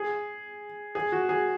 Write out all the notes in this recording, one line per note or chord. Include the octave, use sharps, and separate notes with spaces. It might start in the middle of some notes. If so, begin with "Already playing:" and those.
Already playing: G#4
G#4
F#4
G#4